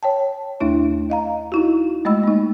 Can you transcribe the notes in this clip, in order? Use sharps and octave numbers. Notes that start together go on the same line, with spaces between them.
C#5 G5 A5
D#2 A3 D4 E4
D#5 F5 A#5
D#4 E4 F#4
G#3 A3 D#5 B5 E6
A#3 D#4